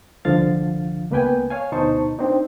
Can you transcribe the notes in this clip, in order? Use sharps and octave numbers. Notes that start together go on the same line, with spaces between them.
C2 D3 F3 F5 A6
C#2 A#3 B3 B4 G5 G#5
C#5 F5 G#5
D2 B2 D#4 C5 A5 C#6
C4 D4 D#4